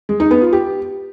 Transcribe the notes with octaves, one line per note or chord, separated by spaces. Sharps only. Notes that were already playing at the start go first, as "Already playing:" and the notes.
G#3
D#4
B3
F4
G4